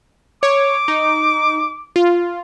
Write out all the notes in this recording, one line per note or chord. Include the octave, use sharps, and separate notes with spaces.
C#5 D6
D#4
F4